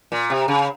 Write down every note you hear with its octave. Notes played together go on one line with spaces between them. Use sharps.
A#2
C3
C#3